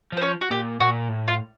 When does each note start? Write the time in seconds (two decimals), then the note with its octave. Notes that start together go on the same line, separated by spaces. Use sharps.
0.12 F3 C5
0.21 C#4 C#5
0.41 F#4
0.50 A#2 G4
0.80 A#2 F#4
1.09 A2
1.28 F4